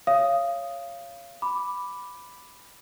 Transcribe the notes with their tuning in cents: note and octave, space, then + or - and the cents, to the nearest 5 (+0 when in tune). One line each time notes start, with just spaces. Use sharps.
C#5 +0 F5 -25 D#6 +0
B5 +0 D6 +0